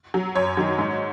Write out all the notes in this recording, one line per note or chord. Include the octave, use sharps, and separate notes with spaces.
F#3
F#2 C#5
D#3 F#3
G#2